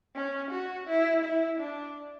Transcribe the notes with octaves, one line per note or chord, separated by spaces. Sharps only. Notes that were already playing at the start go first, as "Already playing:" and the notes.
C#4
F#4
E4
E4
D4